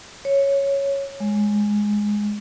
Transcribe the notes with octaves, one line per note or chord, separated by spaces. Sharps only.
C#5
G#3